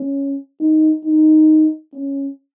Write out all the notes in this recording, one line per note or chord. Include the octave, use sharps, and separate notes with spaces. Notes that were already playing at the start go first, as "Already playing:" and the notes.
Already playing: C#4
D#4
D#4
C#4